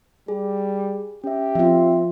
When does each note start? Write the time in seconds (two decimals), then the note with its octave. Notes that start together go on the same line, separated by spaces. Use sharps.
0.28 G3 G#4
1.24 C#4 G4 E5
1.55 F3 C4 F4 E5